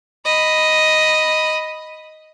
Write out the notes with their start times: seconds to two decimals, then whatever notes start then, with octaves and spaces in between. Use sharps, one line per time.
0.25 D#5 B5